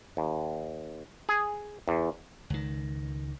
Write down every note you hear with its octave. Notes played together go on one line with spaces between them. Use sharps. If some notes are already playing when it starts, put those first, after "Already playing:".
D#2
G#4
E2
C#2 D#3